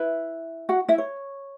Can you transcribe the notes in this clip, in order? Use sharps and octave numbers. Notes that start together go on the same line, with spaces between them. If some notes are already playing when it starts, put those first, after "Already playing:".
Already playing: E4 B4 E5
F#4 F#5
E4 E5
C#5